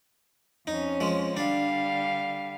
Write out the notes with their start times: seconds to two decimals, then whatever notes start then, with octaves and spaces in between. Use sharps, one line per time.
0.67 F2 C#4 D#4
1.00 F3 G#3
1.37 D3 G3 D4 F5